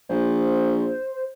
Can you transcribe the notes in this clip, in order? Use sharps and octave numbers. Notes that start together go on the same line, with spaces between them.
A#1 C5